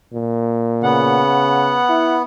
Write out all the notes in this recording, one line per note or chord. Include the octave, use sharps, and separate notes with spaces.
A#2
C#3 B3 F#5
E4